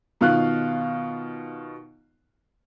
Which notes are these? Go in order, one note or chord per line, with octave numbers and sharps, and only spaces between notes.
B2 D#3 F4 F5 F#6